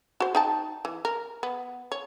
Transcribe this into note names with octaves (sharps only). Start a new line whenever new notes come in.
F#4 C5
D#4 G5 A5
E3
A#4
B3
C#5